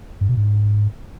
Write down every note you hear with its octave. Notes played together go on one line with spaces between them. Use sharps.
G2
B2
G#2